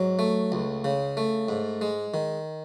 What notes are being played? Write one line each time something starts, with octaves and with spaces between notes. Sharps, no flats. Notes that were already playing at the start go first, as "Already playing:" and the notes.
Already playing: G#2 F#3
A3
C#2
C#3
A3
G#2
G#3
D#3